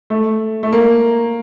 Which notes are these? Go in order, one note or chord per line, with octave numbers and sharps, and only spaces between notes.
A3
A3
A#3